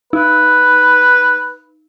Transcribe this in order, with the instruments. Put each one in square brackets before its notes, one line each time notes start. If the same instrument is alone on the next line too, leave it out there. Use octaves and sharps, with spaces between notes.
[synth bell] D#4 [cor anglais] B4